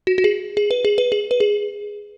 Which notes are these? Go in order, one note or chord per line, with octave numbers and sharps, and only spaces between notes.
F#4
F#4
G#4
G#4
B4
G#4
B4
G#4
B4
G#4